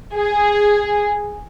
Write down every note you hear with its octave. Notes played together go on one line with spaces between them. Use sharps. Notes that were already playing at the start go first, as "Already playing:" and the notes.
G#4